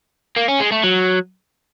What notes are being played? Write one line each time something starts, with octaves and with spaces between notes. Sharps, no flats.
A#3
C#4
G#3
A3
F#3